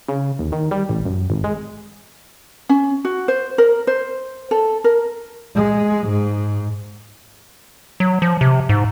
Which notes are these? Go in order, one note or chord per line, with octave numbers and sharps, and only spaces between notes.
C#3
D#2
D#3
G3
A1
F#2
G#1
G#3
C#4
F#4
C5
A#4
C5
A4
A#4
G#3
G#2
F#3
F3
C3
G#2